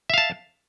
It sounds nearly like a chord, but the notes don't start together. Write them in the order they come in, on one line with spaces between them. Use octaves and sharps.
E5 F5 A5